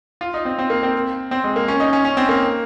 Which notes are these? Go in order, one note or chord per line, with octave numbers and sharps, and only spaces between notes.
F4
D#4
C4
C4
A#3
C4
C4
G#3
A#3
C#4
D#4
C#4
C#4
C4
A#3